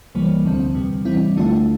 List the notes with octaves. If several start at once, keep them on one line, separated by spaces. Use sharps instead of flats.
C2 C3 E3 G3 A#3
D2 D3 F3 C4
E2 C3 G3
E3 G3 C4 E4
D2 D3 A3 D4 F4